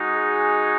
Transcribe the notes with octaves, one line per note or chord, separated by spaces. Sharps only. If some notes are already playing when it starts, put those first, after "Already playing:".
Already playing: G#3 D#4 F#4
G#4